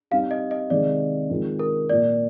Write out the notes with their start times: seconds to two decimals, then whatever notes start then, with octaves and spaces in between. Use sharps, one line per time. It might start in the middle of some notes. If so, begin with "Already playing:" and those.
0.11 G3 C4 D#4 F5
0.31 D#5
0.51 D#5
0.70 C3 D#3 G#3 C4 D#4 D5
1.30 D#3 G#3 C4 F4
1.59 A#4
1.89 A#2 F3 A#3 D5